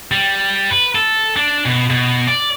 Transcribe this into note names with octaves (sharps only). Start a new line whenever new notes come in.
G3
B4
A4
D4
B2
B2
D5